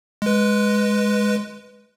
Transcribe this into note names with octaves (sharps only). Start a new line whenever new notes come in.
G#3 B4